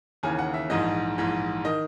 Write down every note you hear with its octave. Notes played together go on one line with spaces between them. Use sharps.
D#2 C#3 E3 G#5
F#5
E5
A#1 G#2 E3 D#5
A#1 G#2 E3
D#3 D#5